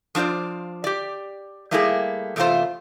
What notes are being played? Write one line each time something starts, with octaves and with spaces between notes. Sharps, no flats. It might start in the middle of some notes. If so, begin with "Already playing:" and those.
F3 D4 F4 C5 D5
G4 D5
G3 A3 A#3 E4 G4 G#4
E2 C3 A3 B3 F4 C5